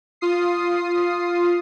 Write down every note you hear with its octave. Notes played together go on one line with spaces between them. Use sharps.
F4 D#6 C7